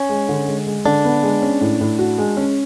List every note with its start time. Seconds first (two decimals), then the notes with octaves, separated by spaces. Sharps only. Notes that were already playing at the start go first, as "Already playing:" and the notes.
Already playing: C#4
0.09 G#3
0.29 D3
0.48 G#3
0.67 G#3
0.86 D3 D4
1.05 B3
1.23 G#3
1.42 C#4
1.61 A2
1.81 A2
1.99 F#4
2.18 G#3
2.37 C#4